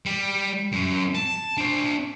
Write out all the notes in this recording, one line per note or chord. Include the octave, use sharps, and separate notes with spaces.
G3
F#2
A5
D4 C5